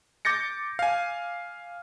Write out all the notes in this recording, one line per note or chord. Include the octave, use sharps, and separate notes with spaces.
D6 G6 A6 A#6 C#7
F5 G#5